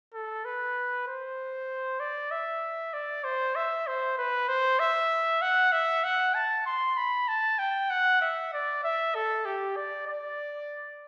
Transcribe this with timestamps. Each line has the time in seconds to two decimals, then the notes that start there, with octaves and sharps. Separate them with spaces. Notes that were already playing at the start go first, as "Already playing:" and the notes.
0.14 A4
0.45 B4
1.08 C5
2.00 D5
2.31 E5
2.94 D5
3.24 C5
3.56 E5
3.87 C5
4.18 B4
4.49 C5
4.79 E5
5.42 F#5
5.72 E5
6.04 F#5
6.35 A5
6.66 C6
6.97 B5
7.28 A5
7.59 G5
7.90 F#5
8.21 E5
8.53 D5
8.84 E5
9.15 A4
9.45 G4
9.76 D5
10.07 D5